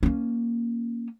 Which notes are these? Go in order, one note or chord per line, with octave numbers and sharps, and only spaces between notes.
A#3 C#4